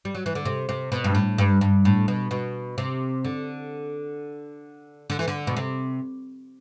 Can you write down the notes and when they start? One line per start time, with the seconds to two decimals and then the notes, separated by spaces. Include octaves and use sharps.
0.05 G3
0.15 F#3
0.26 E3
0.35 D3
0.45 C3
0.69 C3
0.92 B2
1.04 G2
1.15 A2
1.38 G2
1.61 G2
1.85 A2
2.08 B2
2.31 B2
2.78 C3
3.25 D3
5.10 D3
5.19 E3
5.28 D3
5.47 B2
5.56 C3